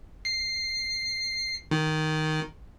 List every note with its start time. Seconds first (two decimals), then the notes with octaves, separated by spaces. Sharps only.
0.25 C7
1.71 D#3